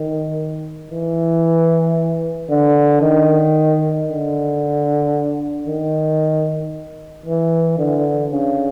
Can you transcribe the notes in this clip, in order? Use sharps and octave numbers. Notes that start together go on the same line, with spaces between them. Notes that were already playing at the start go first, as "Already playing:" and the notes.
Already playing: D#3
E3
D3
D#3
D3
D#3
E3
D3
C#3